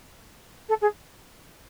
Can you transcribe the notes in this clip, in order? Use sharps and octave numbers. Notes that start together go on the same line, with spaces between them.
A4
G#4